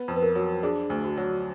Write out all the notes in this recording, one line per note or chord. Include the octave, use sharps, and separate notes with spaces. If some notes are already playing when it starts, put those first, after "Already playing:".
Already playing: B3
F2
B4
A#4
F#3
D4 G#4
D2
F#4
F#3